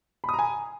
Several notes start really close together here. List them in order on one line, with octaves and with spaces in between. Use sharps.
B5 D#6 A#5 G#5